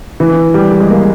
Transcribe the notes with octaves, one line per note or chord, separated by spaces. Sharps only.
E3
G3
G3
G#3
A#3